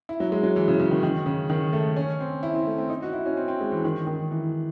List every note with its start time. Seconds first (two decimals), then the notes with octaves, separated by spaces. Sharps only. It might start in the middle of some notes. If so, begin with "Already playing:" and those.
0.09 E4
0.20 F#3
0.32 G#3
0.43 F#3
0.56 E3
0.68 C#3
0.80 C#3
0.91 D#3
1.03 D#3
1.26 C#3
1.50 D#3
1.73 A3
1.96 C#4
2.20 C4
2.43 E4
2.55 C4
2.67 A3
2.78 C4
2.89 D#4
3.02 F#4
3.13 E4
3.26 C#4
3.37 C4
3.48 C4
3.61 G#3
3.72 E3
3.84 D#3
4.07 D#3
4.31 E3